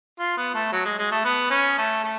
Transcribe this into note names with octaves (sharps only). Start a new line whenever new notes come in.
F4
B3
A3
F#3
G#3
G#3
A3
B3
C#4
A3
A3